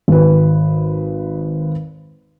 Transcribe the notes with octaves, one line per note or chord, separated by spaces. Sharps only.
G#1 B4